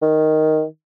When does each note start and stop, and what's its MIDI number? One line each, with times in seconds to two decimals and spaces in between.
0.02 0.64 51